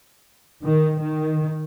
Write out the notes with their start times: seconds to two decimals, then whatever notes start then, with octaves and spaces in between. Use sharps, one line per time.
0.63 D#3
0.99 D#3